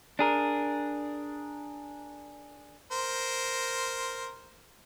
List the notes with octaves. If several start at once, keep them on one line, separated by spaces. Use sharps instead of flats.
D4 G#4 A#4
A#4 C5